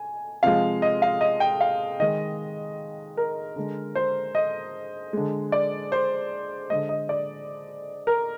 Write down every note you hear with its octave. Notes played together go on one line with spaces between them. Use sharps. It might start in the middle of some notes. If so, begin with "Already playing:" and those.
Already playing: G#5
C3 F3 G#3 F5
D#5
F5
D#5
G5
F5
D#3 G#3 D#5
A#4
D3 G#3
C5
D#5
D3 G#3
D5
C5
D3 G#3 D#5
D#5
D5
A#4